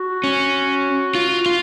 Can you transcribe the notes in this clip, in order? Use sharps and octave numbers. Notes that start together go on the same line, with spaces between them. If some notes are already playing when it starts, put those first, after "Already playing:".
Already playing: F#4
C#4
F4
F4